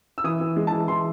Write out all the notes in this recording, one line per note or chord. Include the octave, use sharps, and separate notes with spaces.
E6
E3 D#6
E3
G#3
A5
E3
E3 C6